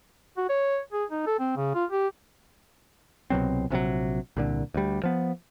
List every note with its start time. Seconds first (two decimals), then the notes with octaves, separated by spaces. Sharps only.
0.37 F#4
0.49 C#5
0.92 G#4
1.11 D#4
1.26 A4
1.39 C4
1.56 C#3
1.74 F4
1.90 G4
3.30 C2 B2 F#3 C4
3.70 A#1 C3 E3 F#3
4.37 C2 A#2 D3
4.74 D2 G3
5.03 F3 B3